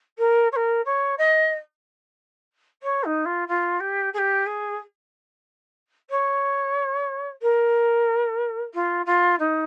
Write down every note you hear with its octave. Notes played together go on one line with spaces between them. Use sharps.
A#4
C#5
A#4
C#5
D#5
C#5
D#4
F4
F4
G4
G#4
G4
G#4
C#5
A#4
F4
F4
D#4